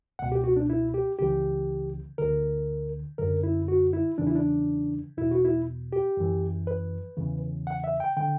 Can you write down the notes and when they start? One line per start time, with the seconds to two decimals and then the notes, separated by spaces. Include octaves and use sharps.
0.19 C#2 B2 F#5
0.32 G4
0.44 F#4
0.56 D4
0.70 E4
0.94 G4
1.19 C#2 C#3 E3 G4
2.18 D2 D3 A#4
3.18 F#2 D3 A#4
3.43 E4
3.68 F#4
3.93 E4
4.18 E2 C#3 E3 D4
4.27 E4
4.35 D4
5.18 E2 B2 E4
5.31 F#4
5.45 E4
5.93 G4
6.17 F#2 E3
6.67 B4
7.17 E2 C#3 E3
7.67 F#5
7.84 E5
8.00 G5
8.17 D3 G5